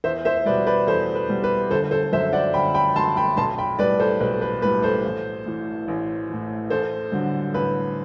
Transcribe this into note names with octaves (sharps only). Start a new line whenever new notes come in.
E2 C5 E5
C5 E5
B2 G3 B4 D5
B4 D5
E2 A4 C5
B4
B2 G3
B4
G1 A4 C5
A4 C5
F#2 F#3 C5 E5
D5 F#5
G1 G5 B5
G5 B5
F#2 F#3 A5 C6
G5 B5
B1 A5 C6
G5 B5
A2 G3 B4 D5
A4 C5
B1 B4
B4
A2 G3 B4
A4 C5
A1
A2 E3
A1
A2 E3
A1 A4 C5
G2 D3 F#3
A1 B4